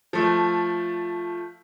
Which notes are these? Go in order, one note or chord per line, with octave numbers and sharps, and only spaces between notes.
F3 A3